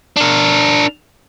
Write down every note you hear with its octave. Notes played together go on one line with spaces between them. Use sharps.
D4 A#4